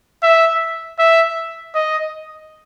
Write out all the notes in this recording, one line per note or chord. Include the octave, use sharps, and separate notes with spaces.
E5
E5
D#5